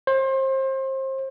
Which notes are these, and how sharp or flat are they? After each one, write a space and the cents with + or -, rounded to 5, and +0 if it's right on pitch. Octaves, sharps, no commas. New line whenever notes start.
C5 +30